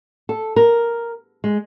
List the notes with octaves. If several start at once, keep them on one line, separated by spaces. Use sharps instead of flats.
A4
A#4
G#3